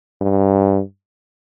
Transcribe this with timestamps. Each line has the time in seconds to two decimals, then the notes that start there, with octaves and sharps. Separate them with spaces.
0.21 G2